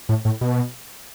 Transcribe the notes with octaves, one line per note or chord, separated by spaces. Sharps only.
A2
A2
B2